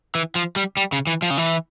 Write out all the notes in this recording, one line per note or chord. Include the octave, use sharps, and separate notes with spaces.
E3
F3
G3
G3
C#3
E3
F3
C#3
E3